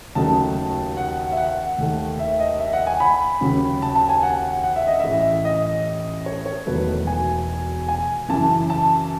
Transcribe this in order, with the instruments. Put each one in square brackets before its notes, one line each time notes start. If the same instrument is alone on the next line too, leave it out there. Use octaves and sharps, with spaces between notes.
[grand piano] D#2 C#3 F#3 A3 D#4 A5
F#5
E5
F#5
D#2 D#3 A3
E5
D#5
E5
F#5
G#5
B5
D#2 C#3 F#3 C#4
A5
A5
G#5
F#5
F#5
E5
D#5
A1 A2 E3 E5
D#5
C#5
C#5
E1 E2 D#3 F#3 A3 B4
G#5
G#5
F#2 C#3 E3 A5
A5